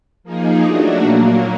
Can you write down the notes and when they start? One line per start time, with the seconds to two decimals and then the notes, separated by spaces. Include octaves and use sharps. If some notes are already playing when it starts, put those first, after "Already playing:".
0.23 F3 A#3 D#4 G#4
0.62 F#3 A3 D4 F#4
0.99 A#2 F#3 A#3